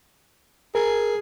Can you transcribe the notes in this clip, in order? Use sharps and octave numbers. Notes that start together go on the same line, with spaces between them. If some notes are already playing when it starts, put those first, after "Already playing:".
G#4 A#4